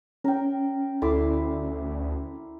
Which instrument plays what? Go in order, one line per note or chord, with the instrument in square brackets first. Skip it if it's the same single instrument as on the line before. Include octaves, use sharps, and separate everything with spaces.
[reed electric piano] C#4 [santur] A#4 G5
[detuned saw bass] D2 [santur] E4 C6 D6 [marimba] A4